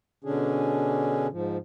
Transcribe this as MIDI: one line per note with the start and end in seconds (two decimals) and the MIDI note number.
0.24 1.27 47
0.24 1.27 50
0.24 1.27 61
0.24 1.27 62
0.24 1.27 68
1.31 1.57 44
1.31 1.57 53